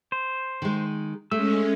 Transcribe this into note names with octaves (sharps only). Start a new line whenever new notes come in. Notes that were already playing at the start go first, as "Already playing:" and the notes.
C5
D#3 G#3
G#3 A3 C#4 E6